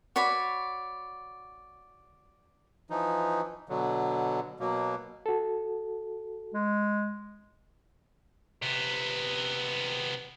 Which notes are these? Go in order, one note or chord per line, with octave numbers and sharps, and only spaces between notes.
F#4 C#5 D5 B5
E3 F3 D#4
B2 D3 F#3
B2 F#3 A#3
F#4 A4
G#3
C3 B3